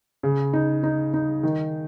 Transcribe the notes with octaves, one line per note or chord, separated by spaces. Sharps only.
C#3
D#4
D#4
D#4
D#3